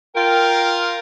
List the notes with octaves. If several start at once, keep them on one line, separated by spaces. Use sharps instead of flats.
F4 A#4 G5